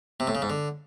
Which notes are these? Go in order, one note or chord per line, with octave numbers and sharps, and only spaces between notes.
C3
A2
C#3
G#2
D3